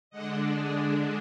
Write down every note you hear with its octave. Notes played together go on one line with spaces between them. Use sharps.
D3 G#3 D4 D#5 F#5
G#4